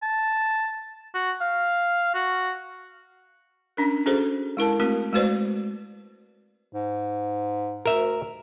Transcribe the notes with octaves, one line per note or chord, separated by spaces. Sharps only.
A5
F#4
F5
F#4
C#4 D4 A#4
C#4 F#4 G#4 A4 C5
G#3 E4 A#4 A5
A3 C4 F#4 A#4
G#3 A3 F#4 B4 C5 D5
G#2
D2 A#4 E5